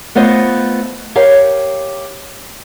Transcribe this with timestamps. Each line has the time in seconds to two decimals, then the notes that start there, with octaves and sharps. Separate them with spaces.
0.15 A3 B3 F4 C5 D#5
1.15 G4 A#4 C#5 F5